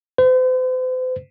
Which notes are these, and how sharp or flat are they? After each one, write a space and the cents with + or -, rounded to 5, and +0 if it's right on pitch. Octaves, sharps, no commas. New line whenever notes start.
C5 -40